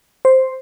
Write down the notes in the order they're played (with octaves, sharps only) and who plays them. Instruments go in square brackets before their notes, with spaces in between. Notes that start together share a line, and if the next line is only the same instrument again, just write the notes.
[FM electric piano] C5